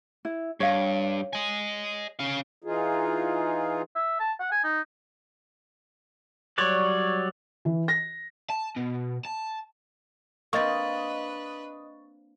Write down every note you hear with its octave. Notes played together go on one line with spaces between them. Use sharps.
E4
G2 C#5 F5
D#5 G#5
C#4 F5
E3 D#4 F4 G#4
E5
A5
F#5
G#5
D#4
F#3 G3 C#5 D5 F#6
E3
A#6
A5
B2
A5
A#3 C4 D4 B4 D#5 C#6 D#6 A6